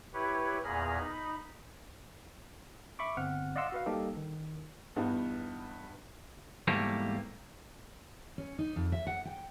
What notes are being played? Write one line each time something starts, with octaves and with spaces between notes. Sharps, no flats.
E4 G4 B4 C#5
E2 A#2 G#4 A#5 B5 F6
D#4 B5
E5 B5 C#6 D6
G1 C4 F#5 F6
D5 D#5 F5 F#5 C6 E6
F#4 B4 F5
G3 A#3 D#4 G4 A4
D#3
E2 G2 B3 D#4
E2 G#2 G3 A3 A#3
C#4
D#4
F2
E5
F#5
G5